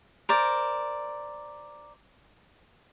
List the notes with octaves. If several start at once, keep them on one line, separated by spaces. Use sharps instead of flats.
A#4 C5 D5